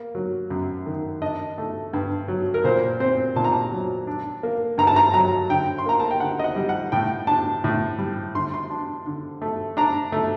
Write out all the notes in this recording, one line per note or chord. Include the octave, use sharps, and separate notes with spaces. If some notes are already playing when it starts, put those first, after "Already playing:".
Already playing: A#3
F#3
F#2
D#3
D4 D#5
A3
G2
F#3
A#4
A#2 C5
C4 C5
A#2 A5
A#5
A5
F#3
D4
A#3
G2 A#5
A5
A#5
F#3 A#5
D3 G5
C6
A#3 A#5
A5
G5
D3 F#5
D#5
F#5
G3
F#5
A2 G5
D4 A5
A2
G3
D3 C6
C6
D4
D3
A3
D4 A#5
A3